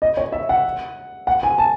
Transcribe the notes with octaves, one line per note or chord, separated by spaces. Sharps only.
D#5
C#5
E5
F#5
F#5
G#5
A5